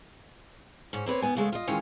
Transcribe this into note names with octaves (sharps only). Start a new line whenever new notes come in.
G#2 C#4
A#3 C4 B4 C#5
D#2 B3 G#5
E2 C#3 G#3 A3
F4 D#5
D#3 E3 G#3 C#4 F4